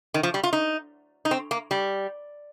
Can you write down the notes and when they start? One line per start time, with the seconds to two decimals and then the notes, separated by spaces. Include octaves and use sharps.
0.14 D#3
0.23 F3
0.34 G3
0.43 F4
0.53 D#4
1.25 D#4
1.31 C4
1.51 A#3
1.71 G3